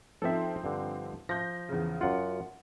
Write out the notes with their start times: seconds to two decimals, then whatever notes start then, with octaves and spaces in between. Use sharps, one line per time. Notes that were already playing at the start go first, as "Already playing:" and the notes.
0.22 F3 C4 D#4 A4 E5
0.64 G2 D3
1.29 F3 G6 A#6
1.69 E2 C#3
2.01 F#2 F4 F#5